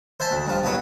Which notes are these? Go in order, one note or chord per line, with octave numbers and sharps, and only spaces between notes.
C5 E5 G#5 A5
D2
G2 F3
C2 B2 F#3 C#5